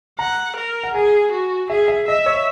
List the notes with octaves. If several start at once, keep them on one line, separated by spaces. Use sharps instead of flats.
F#5 A#5
A#4
F#5
G#4 G#5
F#4
G#4 E5
E5
D#5 E5
C#5